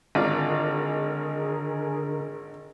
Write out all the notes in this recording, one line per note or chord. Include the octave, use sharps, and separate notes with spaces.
G#1 D3 F4 G#4 A#4 D5